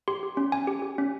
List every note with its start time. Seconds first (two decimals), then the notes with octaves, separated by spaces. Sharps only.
0.08 G4 C6
0.23 G4
0.37 C#4
0.52 C#4 G#5
0.67 G4
0.82 G4
0.98 C#4